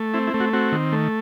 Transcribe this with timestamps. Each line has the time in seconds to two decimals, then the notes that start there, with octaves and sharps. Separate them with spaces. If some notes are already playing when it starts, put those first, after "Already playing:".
Already playing: A3
0.14 C4 E4
0.27 E4
0.34 A3
0.40 F#4
0.53 C4 F#4
0.72 D#3
0.93 A3